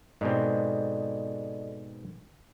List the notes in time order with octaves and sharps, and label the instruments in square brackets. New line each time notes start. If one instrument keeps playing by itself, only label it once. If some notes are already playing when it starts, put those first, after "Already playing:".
[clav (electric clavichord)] G#2 B2 C4 [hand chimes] A4 D5 D#5